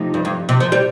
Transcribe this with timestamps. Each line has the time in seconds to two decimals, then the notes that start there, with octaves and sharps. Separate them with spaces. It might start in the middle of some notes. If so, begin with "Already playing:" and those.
Already playing: C3 F3 A3 D#4
0.14 G2
0.25 G2
0.49 C3
0.60 F3
0.72 G3